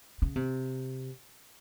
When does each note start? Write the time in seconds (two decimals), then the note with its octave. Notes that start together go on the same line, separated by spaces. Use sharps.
0.22 C#3
0.36 C3